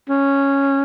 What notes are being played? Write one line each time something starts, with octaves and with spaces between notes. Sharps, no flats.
C#4